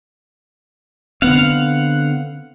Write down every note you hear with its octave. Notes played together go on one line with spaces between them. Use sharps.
D3 B3 C4 F5 F#5